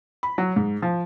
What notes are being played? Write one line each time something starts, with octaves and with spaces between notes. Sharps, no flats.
B5
F#3
G#2
F3